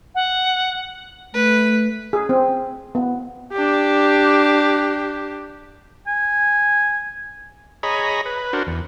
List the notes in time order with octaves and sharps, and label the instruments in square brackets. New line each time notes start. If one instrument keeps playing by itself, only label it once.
[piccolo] F#5
[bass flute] A3 [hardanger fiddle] B4
[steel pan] G#4
C4
B3
[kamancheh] D4 G4
[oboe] G#5
[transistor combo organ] G#4 C#5 D#5 A#5 B5
B4
D4 F#4 A#4 C5
E2